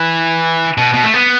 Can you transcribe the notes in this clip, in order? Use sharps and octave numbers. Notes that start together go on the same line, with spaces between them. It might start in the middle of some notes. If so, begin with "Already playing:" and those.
Already playing: E3
B2
B2
A3
B3